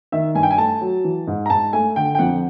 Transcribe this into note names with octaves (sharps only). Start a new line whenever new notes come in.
D#3 E5
G2 G#5
G5
G#5
A3 A5
F#3
E3
G#2
A#5
G#2 A5
A3 G#5
D3 G5
G5
F2 F#5